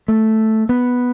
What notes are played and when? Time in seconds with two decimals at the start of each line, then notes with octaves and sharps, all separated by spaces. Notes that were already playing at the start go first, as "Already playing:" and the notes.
0.08 A3
0.69 B3